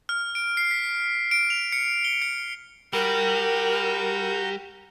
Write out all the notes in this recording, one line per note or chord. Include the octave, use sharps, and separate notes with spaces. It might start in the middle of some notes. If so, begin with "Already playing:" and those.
F6
D7
C7
B6
D7
F7
C#7
G7
C#7
G3 F#4 A#4 A#5 G6